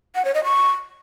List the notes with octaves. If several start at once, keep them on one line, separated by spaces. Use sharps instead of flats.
F#5
C#5
D#5
C#6